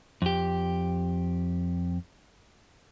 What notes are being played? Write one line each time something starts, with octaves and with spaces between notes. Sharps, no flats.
F2 G4